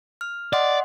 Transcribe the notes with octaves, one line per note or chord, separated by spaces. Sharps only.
F6
D5 D#5 F#5 C6